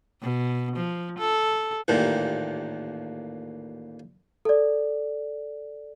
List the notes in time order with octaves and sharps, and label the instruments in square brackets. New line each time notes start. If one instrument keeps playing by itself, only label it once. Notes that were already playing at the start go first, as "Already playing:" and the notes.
[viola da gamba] B2
F3
A4
[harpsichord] A1 D#2 A#2
[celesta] A4 D5